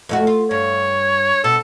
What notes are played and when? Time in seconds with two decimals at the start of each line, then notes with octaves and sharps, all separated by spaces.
0.09 F2 A3 F#4
0.27 F4
0.51 G2 C#5
1.44 B2 A4